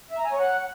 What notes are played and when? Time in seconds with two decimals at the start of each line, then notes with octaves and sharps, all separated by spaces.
0.11 E5
0.18 A#5
0.25 G#5
0.32 C#5
0.39 F#5